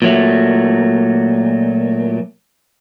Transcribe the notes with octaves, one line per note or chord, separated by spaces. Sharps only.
A#2 F#3 A3